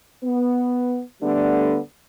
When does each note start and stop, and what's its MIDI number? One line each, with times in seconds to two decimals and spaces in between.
0.24 1.02 59
1.23 1.79 50
1.23 1.79 55
1.23 1.79 57
1.23 1.79 59
1.23 1.79 62